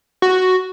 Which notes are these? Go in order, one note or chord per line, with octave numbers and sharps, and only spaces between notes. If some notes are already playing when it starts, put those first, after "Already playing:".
F#4